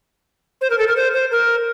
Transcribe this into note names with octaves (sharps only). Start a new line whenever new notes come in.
C5
A#4
A4
A#4
C5
C5
A#4